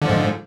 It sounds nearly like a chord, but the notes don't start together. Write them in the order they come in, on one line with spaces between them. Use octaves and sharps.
D3 F3 G#2